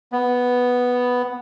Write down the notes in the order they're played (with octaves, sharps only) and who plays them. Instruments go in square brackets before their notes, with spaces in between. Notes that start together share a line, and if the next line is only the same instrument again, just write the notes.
[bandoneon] B3